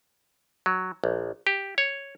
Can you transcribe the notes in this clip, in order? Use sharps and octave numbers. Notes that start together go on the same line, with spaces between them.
F#3
A#1
G4
C#5